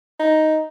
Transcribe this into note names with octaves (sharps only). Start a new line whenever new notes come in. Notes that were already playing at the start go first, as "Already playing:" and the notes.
D#4